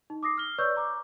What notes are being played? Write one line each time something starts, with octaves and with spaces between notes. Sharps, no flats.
D#4
D6 D#6 A#6 C7
F6 G7
B4 C#5 D5 C#6 E6 G6
A#5 D6